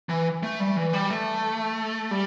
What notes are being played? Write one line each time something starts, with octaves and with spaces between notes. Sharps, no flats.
E3
A3
G3
E3
G3
A3
G3